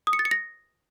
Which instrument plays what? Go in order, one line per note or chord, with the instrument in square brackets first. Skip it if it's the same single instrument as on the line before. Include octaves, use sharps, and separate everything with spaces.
[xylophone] D#6
C#7
A6
C#7
A#6